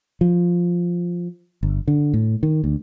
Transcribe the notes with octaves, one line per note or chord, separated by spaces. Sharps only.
F3
G1
D3
A2
D#3
D2